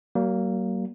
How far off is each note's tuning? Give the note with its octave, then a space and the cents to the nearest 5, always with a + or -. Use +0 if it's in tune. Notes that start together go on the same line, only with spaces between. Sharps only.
F#3 +45 A#3 +0